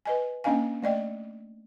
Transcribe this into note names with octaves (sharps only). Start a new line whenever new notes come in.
B4 D#5 G#5
A#3 C#4 D4 D#5 F5 G#5
A3 D5 D#5 G5